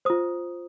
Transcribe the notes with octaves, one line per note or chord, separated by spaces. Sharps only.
F4 C5 D#6